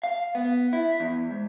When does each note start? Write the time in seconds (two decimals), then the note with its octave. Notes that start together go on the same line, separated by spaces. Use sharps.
0.03 F5
0.35 B3
0.73 E4
1.00 E2
1.30 G#2